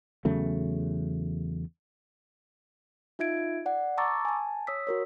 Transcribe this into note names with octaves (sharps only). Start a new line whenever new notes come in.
E2 C#3 F#3 A3
D#4 F4 E5 G#6 D7
D5 F#5
A5 A#5 C#6 D6 E6 A6
G#5 A5
C#5 D#6 E6 B6
F#4 A#4 C#5